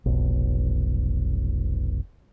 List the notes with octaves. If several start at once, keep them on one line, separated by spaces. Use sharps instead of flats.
F1 B1